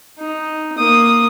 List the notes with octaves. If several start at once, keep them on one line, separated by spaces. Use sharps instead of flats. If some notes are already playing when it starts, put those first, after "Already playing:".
D#4
A#3 D#6